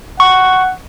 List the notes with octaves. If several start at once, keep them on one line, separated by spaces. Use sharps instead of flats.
F#5 C#6